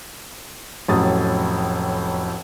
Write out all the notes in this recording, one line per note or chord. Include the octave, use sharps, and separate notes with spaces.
F1 A2 F#3 C#4 D#6 A6